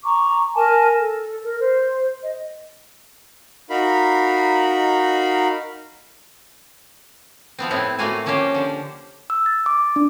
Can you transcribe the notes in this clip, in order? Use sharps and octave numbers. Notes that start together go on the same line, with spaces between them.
A#5 C#6 D6
A#4 G#5 A5
A4
A#4
C5
D#5
D#4 F#4 A#4 F5 B5
F3 B3 C4
A2 B3 C4 E4
A2 A3 A#3 F4 F#4 G#5
F3 A#3 C#4 F4 G4 C5
D3 F3
E6
A6
D6
D4